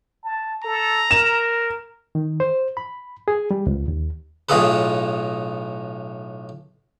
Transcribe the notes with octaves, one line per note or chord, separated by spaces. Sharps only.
A5
A4 A#5
A#4 E7
D#3
C5
B5
G#4
G3
C#2
D#2
B1 A2 F4 G#4 A4 B4